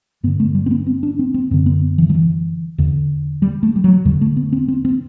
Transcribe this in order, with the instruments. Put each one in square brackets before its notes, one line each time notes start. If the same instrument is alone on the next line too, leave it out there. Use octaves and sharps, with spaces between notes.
[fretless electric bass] G2 B3
D3
A3
G3
C4
B3
C4
D4
C4
C4
F#2 D3 C4
B3
E3
F#3
E3
E2 D3
G3
A3
G3
F#3
E2 D3 G3
A3
B3
C4
C4
C4